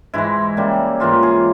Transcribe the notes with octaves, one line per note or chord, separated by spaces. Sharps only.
G#2 E3 G#3 E4
C#3 G3 A#3
G#2 E3 A#3 F4
G#4